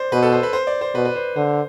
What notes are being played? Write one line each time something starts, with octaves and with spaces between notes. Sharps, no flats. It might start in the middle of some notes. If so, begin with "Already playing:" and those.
Already playing: C5 D5
B2 B4
A4
C5
B4
C5
D5
C5
B2 B4
B4
C5
D3 C5